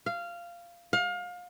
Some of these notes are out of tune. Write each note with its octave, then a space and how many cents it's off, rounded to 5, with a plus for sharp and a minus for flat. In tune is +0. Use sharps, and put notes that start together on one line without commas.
F5 -15
F5 +30